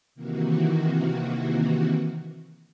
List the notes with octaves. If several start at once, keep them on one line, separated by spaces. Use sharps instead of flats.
C3 D#3 E3 A#3 F#4